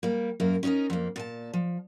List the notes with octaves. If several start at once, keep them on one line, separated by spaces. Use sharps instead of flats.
G3 A#3
F#2 A#3 A#4
C#4 D#4 F#4 A#4 D#5
F2 A#3
A#2 G#5 A5
F3